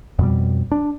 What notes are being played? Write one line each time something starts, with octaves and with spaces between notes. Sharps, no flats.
F2 B2 G3
D4